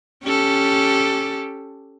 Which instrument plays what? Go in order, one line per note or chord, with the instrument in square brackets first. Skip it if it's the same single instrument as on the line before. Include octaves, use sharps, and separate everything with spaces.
[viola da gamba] C#4 G4 A4